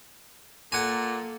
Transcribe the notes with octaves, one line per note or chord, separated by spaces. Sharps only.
A#2 A#3 A4 F#5 G#5